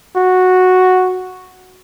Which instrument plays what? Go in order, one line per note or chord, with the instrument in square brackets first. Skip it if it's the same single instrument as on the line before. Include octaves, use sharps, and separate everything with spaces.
[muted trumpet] F#4